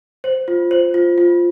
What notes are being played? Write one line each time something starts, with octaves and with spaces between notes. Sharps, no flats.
C5
F4
C5
F4
F4